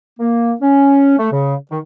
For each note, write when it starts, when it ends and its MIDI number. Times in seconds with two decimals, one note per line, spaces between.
0.20 0.54 58
0.62 1.16 61
1.19 1.28 57
1.32 1.56 49
1.71 1.80 51